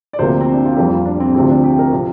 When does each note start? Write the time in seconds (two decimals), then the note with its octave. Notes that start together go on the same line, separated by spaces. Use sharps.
0.13 D5
0.19 D2 C3 F3 A#3 C5
0.40 C4
0.53 D4
0.65 F4
0.77 F1 F2 C3 G3 A#3 G4
0.91 F4
1.06 D4
1.20 C4
1.35 D2 C3 F3 C4
1.50 D4
1.64 G4
1.79 A#4
1.92 C3 F3